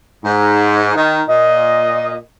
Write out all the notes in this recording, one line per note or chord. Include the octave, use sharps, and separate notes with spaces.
G#2
D#3
A#2 D#5